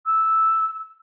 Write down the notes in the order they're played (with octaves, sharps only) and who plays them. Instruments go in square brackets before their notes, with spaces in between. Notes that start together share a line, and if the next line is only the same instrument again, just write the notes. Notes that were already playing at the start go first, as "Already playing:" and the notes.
[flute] E6